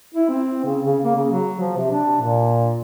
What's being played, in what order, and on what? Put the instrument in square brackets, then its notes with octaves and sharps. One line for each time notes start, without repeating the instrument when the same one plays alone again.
[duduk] E4
C4
C#3
C#3
A#3
C#3
F#3
F3
C3
D4
A#2